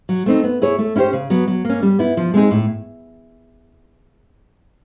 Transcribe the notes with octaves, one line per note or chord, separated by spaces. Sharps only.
F#3
A3 C4 D#4
B3
E4 G#4 C#5
A3
C#4 E4 G4 C5
C#3
F#3 B3
F#3
A#3 C#4
G3
B3 E4
F3
G#3 C4 D#4 G#4
A2